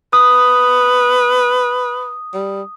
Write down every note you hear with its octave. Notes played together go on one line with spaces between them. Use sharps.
B4 D#6
G3